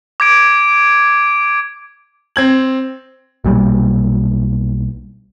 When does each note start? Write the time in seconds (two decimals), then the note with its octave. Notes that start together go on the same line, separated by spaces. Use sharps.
0.20 D6 G#6 D7
2.36 C4 G#6 F#7
3.44 B1 A#2 F3 G3